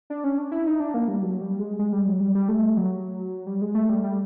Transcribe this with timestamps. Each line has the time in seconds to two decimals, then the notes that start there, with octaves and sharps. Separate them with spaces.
0.10 D4
0.24 C#4
0.38 D4
0.52 E4
0.67 D#4
0.80 D4
0.94 A#3
1.08 G3
1.22 F#3
1.41 G3
1.59 G#3
1.79 G#3
1.93 G3
2.07 F#3
2.21 G3
2.35 G3
2.48 A3
2.77 F#3
3.47 G3
3.62 G#3
3.75 A3
3.89 G3
4.04 G3